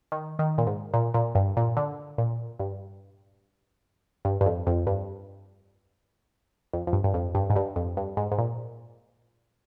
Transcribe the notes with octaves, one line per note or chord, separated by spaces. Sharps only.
D#3
D#3
A#2
G#2
A#2
A#2
G2
A#2
D3
A#2
G2
G2
G2
F2
F2
G2
F2
F2
G2
G2
F2
G2
G#2
G2
F2
G2
G#2
G#2
A#2